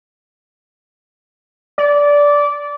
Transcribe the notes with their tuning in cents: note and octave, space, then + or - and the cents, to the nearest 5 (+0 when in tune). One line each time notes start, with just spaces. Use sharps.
D5 -15